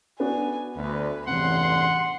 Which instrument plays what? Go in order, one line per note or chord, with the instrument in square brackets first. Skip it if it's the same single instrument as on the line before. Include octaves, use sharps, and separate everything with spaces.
[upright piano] B3 D4 F#4 [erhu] G#5
[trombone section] D2 [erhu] B4
[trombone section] A1 E2 G2 [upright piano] C3 E3 [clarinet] F#5 [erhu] C6